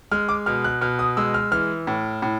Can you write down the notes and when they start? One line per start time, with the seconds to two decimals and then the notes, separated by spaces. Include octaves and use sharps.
0.11 G#3 F6
0.29 D6
0.46 B2 F6
0.64 F#6
0.81 B2 F6
0.99 D#6
1.17 G#3 E6
1.34 F6
1.52 E3 F6
1.87 A2
2.22 A2